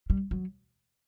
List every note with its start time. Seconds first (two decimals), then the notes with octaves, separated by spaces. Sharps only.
0.10 G3
0.31 F#3